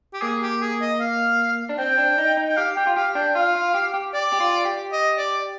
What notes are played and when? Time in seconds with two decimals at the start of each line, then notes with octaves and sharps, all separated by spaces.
0.14 G4
0.22 A#3 G#4
0.42 G4
0.61 G#4
0.81 D#5
1.00 F5
1.69 D4
1.79 C4 G5
1.98 D4
2.18 D#4
2.37 D#4
2.48 G5
2.57 G4 F5
2.76 G4 G5
2.87 F4
2.96 G4 F5
3.15 D4 G5
3.35 F4 F5
3.55 F4
3.74 G4
3.94 G4
4.14 D5
4.33 G4
4.40 F4
4.65 G4
4.92 D#5
5.18 D5